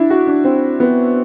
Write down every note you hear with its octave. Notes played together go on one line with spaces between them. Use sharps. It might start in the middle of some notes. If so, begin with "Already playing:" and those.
Already playing: D4 E4
F#4
D4
C4
B3